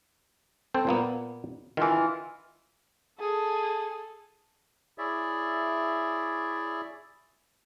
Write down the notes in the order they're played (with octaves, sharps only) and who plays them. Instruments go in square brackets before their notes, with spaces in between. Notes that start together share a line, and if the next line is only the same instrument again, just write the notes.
[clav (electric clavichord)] C4 A4 C5
A#2 A#3 B3
[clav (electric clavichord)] D#3 [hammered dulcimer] E3 F4
[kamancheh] G#4 A4
[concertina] E4 G#4 C#5 D5 E5